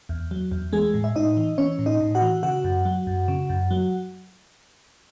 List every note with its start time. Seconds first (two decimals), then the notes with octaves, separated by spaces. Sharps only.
0.09 E2
0.31 F#3
0.52 E2
0.73 E3 G#3 G#4
0.94 A2
1.04 E5
1.16 A2 D#4 D#5
1.37 E3
1.58 E3 C#4 C#5
1.79 A2
1.86 D#4 D#5
2.01 A2
2.15 F#4 F#5
2.22 E3
2.43 C#3 F#4 F#5
2.64 F#2
2.85 F#3
3.07 F#2
3.28 C#3
3.50 F#2
3.71 F#3